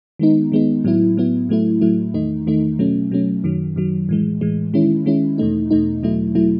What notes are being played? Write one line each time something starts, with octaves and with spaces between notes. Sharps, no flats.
D#3 G#3 B3 D#4
D#3 G#3 B3 D#4
A2 F#3 B3 E4
A2 F#3 B3 E4
A2 F#3 A3 E4
A2 F#3 A3 E4
E2 D#3 A3 D#4
E2 D#3 A3 D#4
B2 F#3 A3 C#4
B2 F#3 A3 C#4
F#2 D#3 F#3
F#2 D#3 F#3
A2 E3 G#3
A2 E3 G#3
D#3 G#3 C#4 E4
D#3 G#3 C#4 E4
E2 B2 A3 D#4
E2 B2 A3 D#4
E2 B2 F#3 A3 E4
B2 F#3 A3 E4